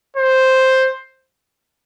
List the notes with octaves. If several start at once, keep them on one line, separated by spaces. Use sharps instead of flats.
C5